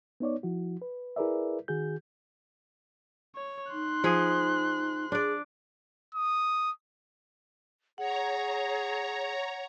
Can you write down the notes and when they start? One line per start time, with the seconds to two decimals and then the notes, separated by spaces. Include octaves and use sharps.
0.20 B3 D#4 C#5 D5
0.43 F3 E4 F#4
0.82 B4
1.16 E4 G#4 A#4 B4 D5 E5
1.68 D#3 F#4 G#4 G6
3.36 C#5
3.72 D#4 C6 F#6
4.04 F3 G#4
5.12 D4 G#4 D5
6.15 D#6
7.98 G#4 C#5 F#5 A#5